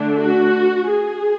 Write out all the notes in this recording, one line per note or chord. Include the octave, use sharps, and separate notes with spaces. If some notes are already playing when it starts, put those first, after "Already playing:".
Already playing: D3 A3 D4
F#4
G#4